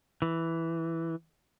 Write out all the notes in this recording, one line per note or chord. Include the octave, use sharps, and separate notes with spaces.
E3